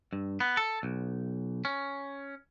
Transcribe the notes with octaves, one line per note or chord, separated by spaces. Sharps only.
G2
B3
A4
B1
C#4